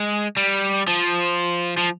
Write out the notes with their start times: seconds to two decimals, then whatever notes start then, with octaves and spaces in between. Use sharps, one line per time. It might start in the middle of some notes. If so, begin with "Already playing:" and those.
Already playing: G#3
0.37 G3
0.88 F3
1.77 F3